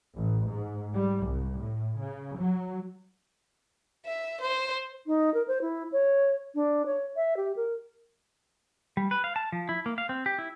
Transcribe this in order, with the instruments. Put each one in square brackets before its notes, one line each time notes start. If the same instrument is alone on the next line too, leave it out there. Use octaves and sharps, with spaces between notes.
[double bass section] A1
G#2
G3
C2
A2
C#3
F#3
[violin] E5
C5
[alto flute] D#4
A#4
C5
E4
C#5
D4
C#5
E5
G4
A#4
[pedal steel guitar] G3
B4
F5
A5
F3
E4
A#3
F5
C4
G4
E4